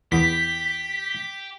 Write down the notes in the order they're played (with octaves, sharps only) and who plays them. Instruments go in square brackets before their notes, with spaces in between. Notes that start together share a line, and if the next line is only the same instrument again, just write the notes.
[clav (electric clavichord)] E2 B3 [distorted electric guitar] G4 [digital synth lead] B6